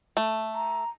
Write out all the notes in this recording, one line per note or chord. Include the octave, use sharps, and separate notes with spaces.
A3
A#5